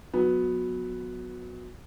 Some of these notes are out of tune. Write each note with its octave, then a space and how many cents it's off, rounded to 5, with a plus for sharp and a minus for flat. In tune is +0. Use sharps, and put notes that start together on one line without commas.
F#3 -20 B3 +0